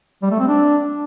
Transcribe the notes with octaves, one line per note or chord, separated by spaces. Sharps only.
G3
A3
C4
D4